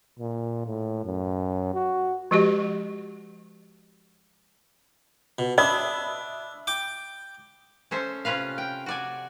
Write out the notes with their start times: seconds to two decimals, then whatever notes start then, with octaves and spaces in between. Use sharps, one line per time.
0.19 A#2
0.67 A2
1.05 F#2
1.74 F#4
2.31 F3 G#3 F#4 G4 D#5
5.39 B2
5.58 D4 D#5 E5 B5 D#6
6.67 G5 D6
7.91 C#4 A4 C5 E5
8.25 C3 C#4 F4 B4 F5
8.58 G5
8.86 F#4 D5 G#5